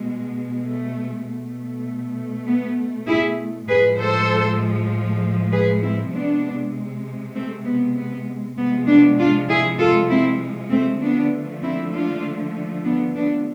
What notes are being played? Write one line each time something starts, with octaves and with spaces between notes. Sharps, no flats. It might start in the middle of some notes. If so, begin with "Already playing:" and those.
Already playing: B2 G#3
A3
B2 A3
B3
E4 G#4
A2 F3 G#3 G#4 B4
A4 C5
G#4 B4
C4 E4
C3 G#3 B3 D4
A3 C4
B3
B3
C3 F3 G#3 B3
B3 D4
D4 F4
E4 G#4
F4 A4
C4 E4
A3 C4
D3 F3 A3 B3 D4
C4 E4
D4 F4
B3 D4
B3 D4